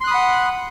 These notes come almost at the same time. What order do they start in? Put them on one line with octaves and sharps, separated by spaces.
C6 F#6 D#6 B5 F#5